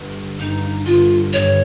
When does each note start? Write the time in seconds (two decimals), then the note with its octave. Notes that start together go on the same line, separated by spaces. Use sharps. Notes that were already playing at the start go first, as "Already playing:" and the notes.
Already playing: G1
0.39 G2 D#3 A#3 D#4
0.85 G1 F4
1.32 G2 D#3 A#3 C#5